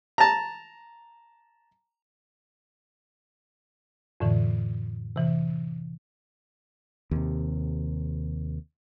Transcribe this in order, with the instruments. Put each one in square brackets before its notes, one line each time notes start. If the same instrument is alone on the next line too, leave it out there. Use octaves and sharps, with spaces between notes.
[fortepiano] A5 A#5
[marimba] F2 A2 D3 E3
C3 E3
[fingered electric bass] D#2 C3